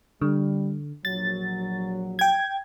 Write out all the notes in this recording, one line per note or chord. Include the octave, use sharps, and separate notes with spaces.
D3 G3
A#1 F#3 A6
G5 G#6